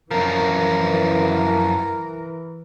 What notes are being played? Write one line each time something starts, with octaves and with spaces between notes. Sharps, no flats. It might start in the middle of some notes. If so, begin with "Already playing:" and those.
F#2 E3 F3 A#4